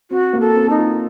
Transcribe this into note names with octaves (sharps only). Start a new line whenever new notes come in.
C4 F#4
A#3
A4
C4
D#4
F4